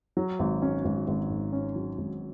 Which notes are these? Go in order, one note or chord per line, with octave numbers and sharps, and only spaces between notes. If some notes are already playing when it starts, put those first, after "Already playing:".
F#3
G#1
C#4
G#1
G#1
G#2
C#4
F#3
G#1